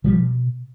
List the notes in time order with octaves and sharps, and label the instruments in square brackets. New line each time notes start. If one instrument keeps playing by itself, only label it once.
[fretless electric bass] B2 F3 G3